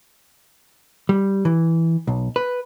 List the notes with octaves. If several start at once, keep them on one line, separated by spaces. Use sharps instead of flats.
G3
E3
B1
B4